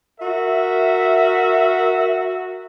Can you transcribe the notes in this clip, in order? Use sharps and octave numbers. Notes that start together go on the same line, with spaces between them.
F#4 A#4 E5